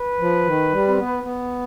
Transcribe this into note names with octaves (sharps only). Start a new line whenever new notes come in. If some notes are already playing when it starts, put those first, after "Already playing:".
Already playing: B4
F3
D#3
G3
C4
B3
B3